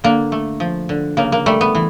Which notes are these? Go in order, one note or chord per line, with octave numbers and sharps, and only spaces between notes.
D3 A#3
A3
F3
D3
C#3 A#3
A#3
G3 A3
B3
E3